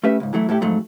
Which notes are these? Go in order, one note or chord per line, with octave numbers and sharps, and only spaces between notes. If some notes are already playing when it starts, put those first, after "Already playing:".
A3 C#4 G4 B4 E5
C#2 G#2
E3 F#3 A3 E4
A2 A3 E4 G4
F2 G#2 F#3 A3